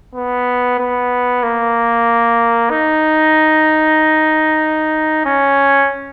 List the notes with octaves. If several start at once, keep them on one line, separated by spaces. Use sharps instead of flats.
B3
B3
A#3
D#4
C#4